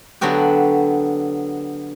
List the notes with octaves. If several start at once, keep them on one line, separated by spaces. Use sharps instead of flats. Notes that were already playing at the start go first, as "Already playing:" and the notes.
D3 F#3 B3 F#4 G4